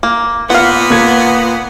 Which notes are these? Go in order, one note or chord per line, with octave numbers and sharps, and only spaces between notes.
A#3
A#2 B3 F5 F#5
A#3 G#6